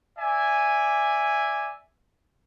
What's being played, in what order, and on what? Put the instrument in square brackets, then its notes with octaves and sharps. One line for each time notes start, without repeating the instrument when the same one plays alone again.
[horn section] D5 E5 G#5